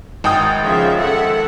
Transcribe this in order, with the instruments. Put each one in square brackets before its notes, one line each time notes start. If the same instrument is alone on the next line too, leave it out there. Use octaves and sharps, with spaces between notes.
[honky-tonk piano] G#1 G5 D#6
[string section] C#3 F3 E5
A4 E5 F#5